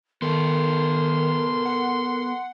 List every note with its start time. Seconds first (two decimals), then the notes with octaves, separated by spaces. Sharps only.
0.22 D#3 B3 A4 A#4 C6
1.66 F#5